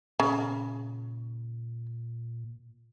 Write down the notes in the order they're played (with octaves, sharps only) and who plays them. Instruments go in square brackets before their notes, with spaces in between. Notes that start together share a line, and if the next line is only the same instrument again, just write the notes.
[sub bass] A#2 [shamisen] C#3